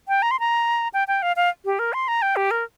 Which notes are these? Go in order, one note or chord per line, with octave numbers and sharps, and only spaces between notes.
G5
A#5
C6
A#5
G5
G5
F5
F5
G4
A#4
C6
A#5
G5
G4
A#4